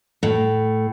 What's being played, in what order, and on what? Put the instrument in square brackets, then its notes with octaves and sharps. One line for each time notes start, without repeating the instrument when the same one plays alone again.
[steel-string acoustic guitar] A2